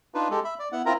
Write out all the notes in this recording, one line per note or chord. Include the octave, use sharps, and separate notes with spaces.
D4 D#4 F4 B4
G#3 G4 A4
E5 B5
D5
B3 E4 F#5
C4 E4 F4 A#4 A#5